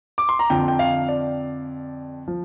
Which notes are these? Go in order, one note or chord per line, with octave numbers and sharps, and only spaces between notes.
D6
C6
A#5
F2 D3 F3 G5
G5
F5
D5
F3